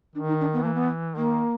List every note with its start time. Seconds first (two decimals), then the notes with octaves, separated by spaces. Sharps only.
0.15 D#3 D4
0.28 D#4
0.40 D4
0.53 B3
0.64 E3 A#3
0.74 B3
1.16 D#3 A#3